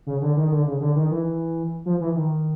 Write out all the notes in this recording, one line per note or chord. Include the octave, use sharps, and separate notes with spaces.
C#3
D3
D#3
D3
C#3
D3
D#3
E3
F3
E3
D#3